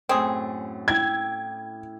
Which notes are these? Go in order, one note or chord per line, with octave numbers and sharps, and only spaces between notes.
F#2 A2 C4 G#4
E4 G5 G#6